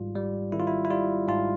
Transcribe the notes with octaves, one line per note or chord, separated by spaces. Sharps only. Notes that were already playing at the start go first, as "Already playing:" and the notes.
Already playing: G#1 G#2 G3 F4
G3
G#1 E4
F4
E4
E4
G3 F4
G#2 F4